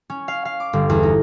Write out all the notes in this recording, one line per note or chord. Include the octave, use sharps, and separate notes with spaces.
C#4
F5
F5
D6
G1
E2
D#4